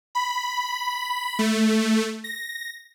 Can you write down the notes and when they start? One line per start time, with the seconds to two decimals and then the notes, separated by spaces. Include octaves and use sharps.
0.15 B5
1.39 A3
2.24 A#6